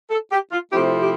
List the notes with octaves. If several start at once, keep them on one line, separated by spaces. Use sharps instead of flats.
A4
G4
F4
C3 F3 A3 C4 E4 G4
G4